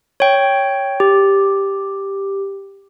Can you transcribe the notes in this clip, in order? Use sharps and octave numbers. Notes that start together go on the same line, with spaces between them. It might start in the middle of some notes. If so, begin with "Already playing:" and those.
C#5 G5
G4